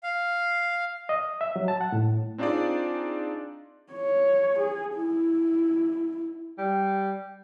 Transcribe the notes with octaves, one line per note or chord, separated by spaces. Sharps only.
F5
D#5
E5
F#3
A5
F#5
A2
C4 D4 D#4 F4 G#4 D5
C#5
G#4
E4
G3